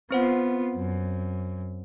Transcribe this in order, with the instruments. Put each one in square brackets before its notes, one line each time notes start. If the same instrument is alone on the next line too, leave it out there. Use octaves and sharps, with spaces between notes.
[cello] B3 F4 [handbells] C4 C5 F#5
[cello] F#2